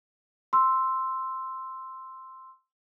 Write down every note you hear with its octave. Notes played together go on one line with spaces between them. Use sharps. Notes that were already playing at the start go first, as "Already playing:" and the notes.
C6 E6